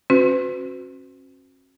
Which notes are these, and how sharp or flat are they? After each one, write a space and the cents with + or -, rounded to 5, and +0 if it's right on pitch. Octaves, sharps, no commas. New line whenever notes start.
C#4 -45 F#4 -15 B4 +40